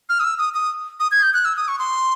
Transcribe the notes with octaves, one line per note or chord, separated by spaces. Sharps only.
F6
D#6
E6
D#6
D#6
D#6
G#6
G6
F#6
E6
D#6
C#6
C6